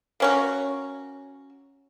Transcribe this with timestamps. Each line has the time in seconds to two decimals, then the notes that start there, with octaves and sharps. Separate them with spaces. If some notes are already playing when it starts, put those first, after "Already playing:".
0.20 A#3 C#4 F#4